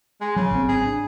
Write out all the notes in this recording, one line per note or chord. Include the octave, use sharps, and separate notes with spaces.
G#3
C#3 F#3
G#1 C4
G#4
D4